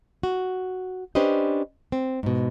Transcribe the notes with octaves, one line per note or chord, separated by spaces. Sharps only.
F#4
C#4 D4 G4 B4 C5 D#5
C4
G#2 B2